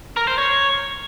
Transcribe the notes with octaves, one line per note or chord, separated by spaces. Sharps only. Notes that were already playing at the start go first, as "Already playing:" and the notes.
A#4
C5
C#5